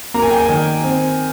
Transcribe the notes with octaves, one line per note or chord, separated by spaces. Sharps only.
A#3 A#5
G#5
G5
G#5
D#3
C4